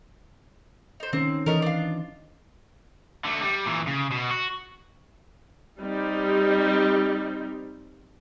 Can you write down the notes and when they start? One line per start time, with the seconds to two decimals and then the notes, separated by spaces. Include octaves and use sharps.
1.00 D#4 C5
1.13 D#3 A#3 C4 C#4 C5
1.46 E3 A3 C#4 A#4 D#5
1.62 D4 F4
3.25 D3 A3
3.42 G3
3.66 A#2 E3
3.87 C#3
4.12 B2
4.31 F#4
5.79 G3 C4 D#4